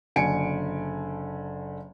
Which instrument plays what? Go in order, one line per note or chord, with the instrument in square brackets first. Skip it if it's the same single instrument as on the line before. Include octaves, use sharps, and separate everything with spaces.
[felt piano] F#1 D3 G#5 C#7 D7